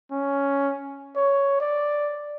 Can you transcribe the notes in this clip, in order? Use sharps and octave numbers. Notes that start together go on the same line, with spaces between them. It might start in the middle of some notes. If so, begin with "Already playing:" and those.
C#4
C#5
D5